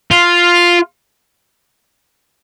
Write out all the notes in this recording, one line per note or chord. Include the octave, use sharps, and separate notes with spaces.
F4